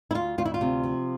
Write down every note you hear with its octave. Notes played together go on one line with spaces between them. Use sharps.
E4
D2 F4
D2 F4
E4
F4
C3
F3